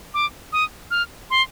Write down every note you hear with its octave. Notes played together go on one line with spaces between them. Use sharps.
D6
D#6
F6
C6